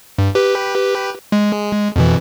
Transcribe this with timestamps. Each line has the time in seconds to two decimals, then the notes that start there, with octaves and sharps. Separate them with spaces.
0.18 G2
0.35 G4 B4
1.32 G#3
1.96 F2 B2 E3